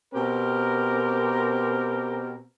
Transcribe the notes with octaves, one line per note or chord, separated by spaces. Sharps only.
B2 C4 G4 A#4